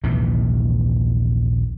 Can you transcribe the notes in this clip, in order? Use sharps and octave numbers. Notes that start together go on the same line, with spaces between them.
A#1 D#2 C3 E3